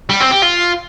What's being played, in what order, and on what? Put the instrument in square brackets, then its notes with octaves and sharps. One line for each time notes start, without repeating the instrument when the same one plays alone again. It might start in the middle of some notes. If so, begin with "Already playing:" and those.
[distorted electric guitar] G3
C4
G4
F4